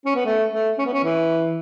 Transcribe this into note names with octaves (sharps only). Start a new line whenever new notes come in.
C#4
B3
A3
A3
C#4
B3
C#4
E3